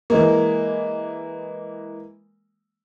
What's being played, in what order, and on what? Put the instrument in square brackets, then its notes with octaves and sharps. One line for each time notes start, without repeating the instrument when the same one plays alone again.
[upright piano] E3 G#3 A#3